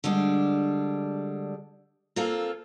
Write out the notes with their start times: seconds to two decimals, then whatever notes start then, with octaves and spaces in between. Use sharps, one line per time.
0.04 D3 G3 G#3 D4
2.16 A#3 C4 F4 A4 F5